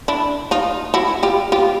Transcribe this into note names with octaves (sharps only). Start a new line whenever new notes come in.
D4 E4
D#4 F4
E4 F#4
F4 G4
F4 G4